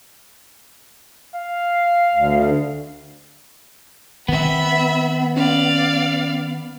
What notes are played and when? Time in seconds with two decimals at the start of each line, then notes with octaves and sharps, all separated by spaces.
1.35 F5
2.14 D2
4.28 D#3 B3 C4 E5 B5
5.36 C#4 D5 F5